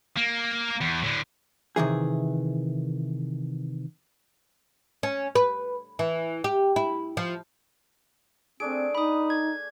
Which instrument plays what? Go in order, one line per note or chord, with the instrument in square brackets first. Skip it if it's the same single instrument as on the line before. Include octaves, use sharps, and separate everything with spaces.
[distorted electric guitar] A#3
E2
A2 D3
[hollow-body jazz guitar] C3 D#3 E3 G#4
[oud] C#4
B4
E3
G4
E4
F3
[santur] A3 D4 G#4 [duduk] C4 [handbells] D7
[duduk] D#4 [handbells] B5 D#6
[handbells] G#6